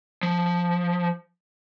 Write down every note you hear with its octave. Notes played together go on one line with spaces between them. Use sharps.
F3